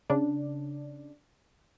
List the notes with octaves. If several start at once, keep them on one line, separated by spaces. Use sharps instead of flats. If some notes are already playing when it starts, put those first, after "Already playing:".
C#3 D4